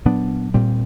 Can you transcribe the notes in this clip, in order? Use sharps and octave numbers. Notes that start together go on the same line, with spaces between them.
A#2 F#3 B3 D4
A#2 G3 C4